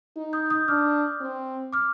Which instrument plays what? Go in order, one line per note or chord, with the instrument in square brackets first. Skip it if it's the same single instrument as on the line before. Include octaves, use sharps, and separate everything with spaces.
[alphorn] D#4
[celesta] D#6 G6
D#6 G6
[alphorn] D4 [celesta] D6 F6
[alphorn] C4
[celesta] D6 F6